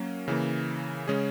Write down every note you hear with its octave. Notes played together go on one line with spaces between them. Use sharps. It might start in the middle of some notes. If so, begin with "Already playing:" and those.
Already playing: F#3 A#3 C#4
C#3 E3 A#3
C#3 G#3 C#4 G#4